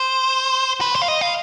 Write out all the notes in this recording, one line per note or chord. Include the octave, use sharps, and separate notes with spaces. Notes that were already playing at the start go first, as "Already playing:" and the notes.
Already playing: C5
B4
C5
F5
D#5
F5